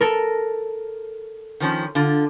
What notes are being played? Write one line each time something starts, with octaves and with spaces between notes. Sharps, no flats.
A4 A#4
D#3 F3 C#4
D3 F4